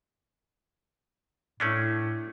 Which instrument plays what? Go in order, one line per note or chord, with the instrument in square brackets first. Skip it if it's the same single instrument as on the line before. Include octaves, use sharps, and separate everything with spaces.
[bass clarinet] A2 [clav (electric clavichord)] A3 C#4 D4